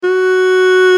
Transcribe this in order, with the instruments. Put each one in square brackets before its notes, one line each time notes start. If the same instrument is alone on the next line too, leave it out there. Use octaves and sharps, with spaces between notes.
[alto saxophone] F#4